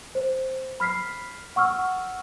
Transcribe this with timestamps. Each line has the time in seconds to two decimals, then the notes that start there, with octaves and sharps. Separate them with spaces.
0.15 C5
0.80 B5 F6 B6 C7
1.56 F#5 C#6 E6 F6